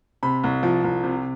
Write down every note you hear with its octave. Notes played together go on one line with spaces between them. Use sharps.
C3 B5
C2
F3
C2
C3